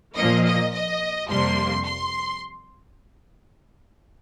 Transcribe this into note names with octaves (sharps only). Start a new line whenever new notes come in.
A#2 F3 A#3 D#5
D#5
D#5
F2 C3 G3 A#3 D4 C6
C6